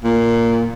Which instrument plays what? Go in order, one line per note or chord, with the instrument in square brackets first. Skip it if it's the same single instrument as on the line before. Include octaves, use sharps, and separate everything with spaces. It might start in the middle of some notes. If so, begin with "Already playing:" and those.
[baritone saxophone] A#2